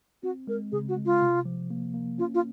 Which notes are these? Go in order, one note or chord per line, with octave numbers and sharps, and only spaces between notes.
C4 F#4
G#3 A#4
C#3 G#4
F#4
G#3
F4
C3
F3
A#3
A#3
C#4 F4
F4